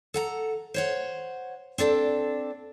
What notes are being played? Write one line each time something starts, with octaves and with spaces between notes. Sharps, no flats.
A4 F#5 A#5
C5 C#5 F#5
C4 D4 A4 D5